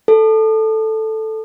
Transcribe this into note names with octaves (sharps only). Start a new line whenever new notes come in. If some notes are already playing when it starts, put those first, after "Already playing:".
A4